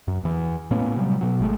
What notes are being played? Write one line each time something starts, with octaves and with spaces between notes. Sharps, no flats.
F#2
E2 E3
A2 A#3 B3 C#4
C3 F#3 G3
B2 F#3
G#1 G#3 A3